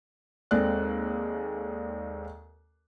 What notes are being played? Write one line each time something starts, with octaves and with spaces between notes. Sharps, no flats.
D#2 G#3 C4 A4 D5 F#6